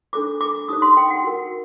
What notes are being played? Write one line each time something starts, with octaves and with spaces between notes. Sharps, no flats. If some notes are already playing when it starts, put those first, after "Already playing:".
D4 A4 C5 D6
D6
D#4 G4 C5 D#6
C6
G5
F#5
F#4 A#4